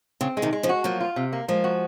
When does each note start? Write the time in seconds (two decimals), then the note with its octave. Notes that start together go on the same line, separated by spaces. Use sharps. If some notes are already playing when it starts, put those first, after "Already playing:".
0.21 C#3 C4
0.37 C#3 G#3
0.42 C3 D#3
0.53 G#3
0.63 C#3 F3
0.69 F#4
0.84 F3 F#3 A#3
1.00 F4
1.16 C3
1.33 A#3
1.48 F3 G#3 A#3
1.64 F#4